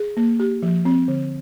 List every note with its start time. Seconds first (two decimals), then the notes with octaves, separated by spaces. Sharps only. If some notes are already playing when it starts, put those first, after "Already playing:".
Already playing: G#4
0.17 A#3
0.40 G4
0.63 F3
0.85 C4
1.08 D3